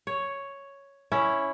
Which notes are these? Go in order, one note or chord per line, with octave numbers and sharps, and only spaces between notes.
C#5
C#4 E4